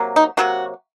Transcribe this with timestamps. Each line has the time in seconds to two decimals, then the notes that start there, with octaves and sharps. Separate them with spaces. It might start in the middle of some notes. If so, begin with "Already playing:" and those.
Already playing: C3 F#3 A#3
0.16 D#4
0.37 C3 F#3 A#3 F#4